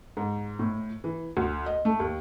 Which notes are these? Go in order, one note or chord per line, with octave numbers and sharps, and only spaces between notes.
G#2
A2
E3
D2
D#5
A3
D#2